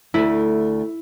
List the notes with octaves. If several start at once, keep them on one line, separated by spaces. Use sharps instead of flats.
D2 A3 E4